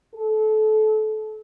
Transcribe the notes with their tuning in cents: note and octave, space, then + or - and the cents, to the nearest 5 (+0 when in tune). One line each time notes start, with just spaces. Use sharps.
A4 -25